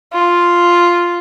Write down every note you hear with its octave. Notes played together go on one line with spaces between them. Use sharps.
F4